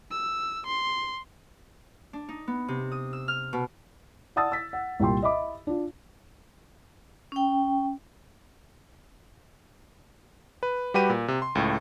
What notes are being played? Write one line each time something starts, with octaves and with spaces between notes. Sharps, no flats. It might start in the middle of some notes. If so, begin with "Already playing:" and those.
E6
C6
D4
D#4
B3
C3
D#6
E6
F6
B2
D5 F#5 A5 D#6 E6 A6
E6 B6
F#5
C2 A#2 G5 C6
D#5 E5 B5 D6
D4 F4
C#4 G5
B4
G3 F#4 G4 B4 D#7
A#2
C3
C6
C#2 A2